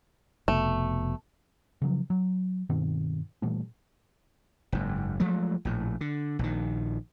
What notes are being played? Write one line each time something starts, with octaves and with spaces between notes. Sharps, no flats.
F1 B2 A3
C#3 F3 F#3
F#3
G2 B2 D#3 C4
A#2 E3 G3 A3
F#1 G#2
F3 F#3 G#3 A3
A#1 A2
D3
A#1 D#3